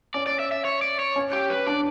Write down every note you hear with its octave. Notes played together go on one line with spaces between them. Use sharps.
C#4 D5
D5
E5
E5
C#5
D5
C#5
C#4
G4
B4
D4 D5